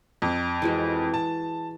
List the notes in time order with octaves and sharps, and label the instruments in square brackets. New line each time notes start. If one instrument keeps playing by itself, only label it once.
[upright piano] F2
[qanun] E3 G#3 F#4
[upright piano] A5